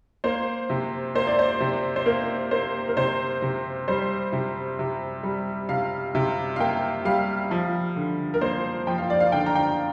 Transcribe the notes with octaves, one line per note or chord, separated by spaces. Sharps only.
A#3 C5
C3
A#3 C5
D5
C5
C3
C5
A#3 A#4
A#3 C5
A#4
C3 C5
C3
G3 C5
C3
C3
G3
C3 F5
C3
F5
A#3 G5
G3 F5
F3
D3
A#4
A#3 C5
F3 G5
F5
D5
F5
D3 G5
A#5
G5